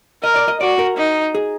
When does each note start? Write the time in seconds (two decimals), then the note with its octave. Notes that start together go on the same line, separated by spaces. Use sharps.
0.23 A#4 D#5
0.36 D5
0.48 D#5
0.61 F#4 D5
0.79 A#4
0.97 D#4
1.35 G#4